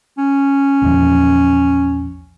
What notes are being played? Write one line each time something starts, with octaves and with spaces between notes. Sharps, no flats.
C#4
A#1 E2 F3